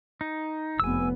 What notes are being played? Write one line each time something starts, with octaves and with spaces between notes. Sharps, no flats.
D#4
F1 B3 G#5 E6